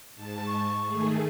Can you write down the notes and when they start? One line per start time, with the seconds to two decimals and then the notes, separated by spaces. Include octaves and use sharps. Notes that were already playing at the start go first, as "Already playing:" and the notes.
0.15 G#2 A5
0.47 C#6
0.85 D#3 A3 G#4